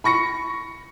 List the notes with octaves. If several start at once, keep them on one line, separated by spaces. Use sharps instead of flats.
B5 C#6 A#6 C#7